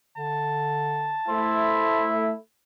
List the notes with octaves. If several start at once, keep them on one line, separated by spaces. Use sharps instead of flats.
D3 A5
A3 E4 C5